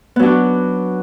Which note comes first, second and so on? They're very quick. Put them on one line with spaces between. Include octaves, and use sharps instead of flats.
B3 F#3 D4 F#4